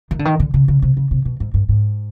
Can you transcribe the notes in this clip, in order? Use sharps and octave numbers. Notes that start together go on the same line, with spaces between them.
D#3
D3
D#3
D3
C#3
C#3
C3
C#3
C3
B2
G#2
G2
G#2